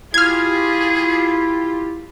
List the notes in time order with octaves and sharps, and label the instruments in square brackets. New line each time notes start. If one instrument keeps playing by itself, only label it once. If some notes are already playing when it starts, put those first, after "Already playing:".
[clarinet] E4 [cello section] F4 G4 [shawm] G#4 [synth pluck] F6 G#6